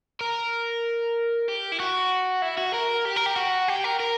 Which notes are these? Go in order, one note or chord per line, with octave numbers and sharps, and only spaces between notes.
A#4
G4
E4
F#4
E4
F#4
A#4
G4
A#4
G4
F#4
G4
A#4
A#4